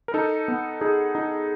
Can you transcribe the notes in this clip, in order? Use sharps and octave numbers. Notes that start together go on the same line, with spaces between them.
A#4
D#4 A4
B3
D#4 G#4
D#4